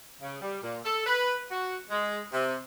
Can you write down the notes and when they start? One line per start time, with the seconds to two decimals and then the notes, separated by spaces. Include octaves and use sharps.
0.21 C#3
0.41 G3
0.62 A#2
0.84 A4
1.05 B4
1.51 F#4
1.90 G#3
2.32 C3